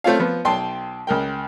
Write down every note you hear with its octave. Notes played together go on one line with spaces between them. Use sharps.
A3 C4 F4 C#5 F5
F3 B3
B1 G5 A5 C6
C#2 A#4 G5